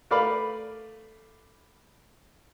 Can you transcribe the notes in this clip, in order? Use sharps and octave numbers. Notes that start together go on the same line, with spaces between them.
A3 A#4 B4 D5 F5 B5